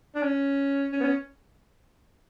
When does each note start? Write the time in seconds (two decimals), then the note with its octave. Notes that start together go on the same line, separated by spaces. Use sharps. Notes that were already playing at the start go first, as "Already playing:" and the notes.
0.15 D4
0.23 C#4
0.92 C#4
1.00 B3
1.03 C#4